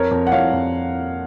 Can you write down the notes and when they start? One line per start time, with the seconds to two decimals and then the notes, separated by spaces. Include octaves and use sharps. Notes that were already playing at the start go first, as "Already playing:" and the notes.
Already playing: F2 A#4 C#5
0.11 F2
0.27 F#5
0.32 F2 C#5 F5
0.52 F2